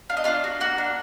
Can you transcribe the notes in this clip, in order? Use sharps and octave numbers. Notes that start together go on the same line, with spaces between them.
D4 F5
D#5
D4 F4 F5
F#4
A#3 F#4 F#5
D4